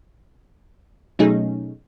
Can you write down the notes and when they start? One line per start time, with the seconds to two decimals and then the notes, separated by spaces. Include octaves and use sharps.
1.19 B2 F#3 A3 C#4 D#4 G#4